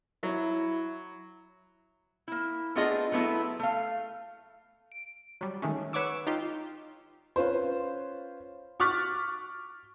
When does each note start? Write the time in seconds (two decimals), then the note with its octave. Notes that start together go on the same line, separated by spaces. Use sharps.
0.23 F#3 E4
2.28 A#3 E4
2.75 A3 B3 D4 F4 G#4 D#5
3.12 F#3 A3 B3 E4
3.59 A3 F5
4.92 D7
5.41 F#3 G3
5.62 D#3 G#3 A3 C#4
5.93 B4 C#5 F#5 C#6 D6 E6
6.27 D#4 F4 G4
7.36 C#4 F4 B4 C5
8.80 C#6 D6 F6 F#6 A6 B6